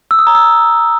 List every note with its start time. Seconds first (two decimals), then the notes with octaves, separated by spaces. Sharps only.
0.11 E6
0.19 D#6
0.27 A#5
0.35 E6